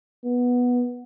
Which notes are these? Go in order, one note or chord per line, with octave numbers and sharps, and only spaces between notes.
B3